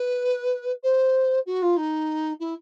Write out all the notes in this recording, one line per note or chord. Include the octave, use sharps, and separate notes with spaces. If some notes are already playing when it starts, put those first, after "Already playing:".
Already playing: B4
C5
F#4
F4
D#4
E4